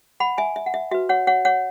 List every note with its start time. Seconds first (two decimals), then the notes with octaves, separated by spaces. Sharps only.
0.20 F#5 B5
0.38 E5 G#5
0.56 E5
0.66 F#5
0.74 E5
0.91 F#4 B4 E5
1.09 C#5 F#5
1.27 C#5 F#5
1.45 C#5 F#5